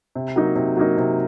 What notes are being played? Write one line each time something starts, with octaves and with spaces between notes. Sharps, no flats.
C3
F#3 A#3 D#4
C3
F#3 A#3 D#4
C3